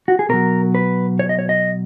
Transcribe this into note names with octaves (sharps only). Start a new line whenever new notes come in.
F#4
G#4
B2 F#3 A#4
B4
C#5
D#5
C#5
D#5